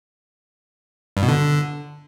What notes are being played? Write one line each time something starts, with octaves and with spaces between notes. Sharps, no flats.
G2
B2
D3